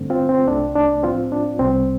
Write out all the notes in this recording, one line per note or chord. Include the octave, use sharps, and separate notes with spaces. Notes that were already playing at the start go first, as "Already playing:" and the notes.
Already playing: G2 D3 A3 C4
C4 F4
C4
C2 C3 A3 D4
D4
A2 F3 C4 F4
D4
C2 C3 G3 C4